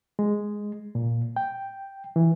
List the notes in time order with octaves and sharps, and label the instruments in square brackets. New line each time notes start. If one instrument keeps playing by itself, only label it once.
[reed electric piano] G#3
A#2
G5
E3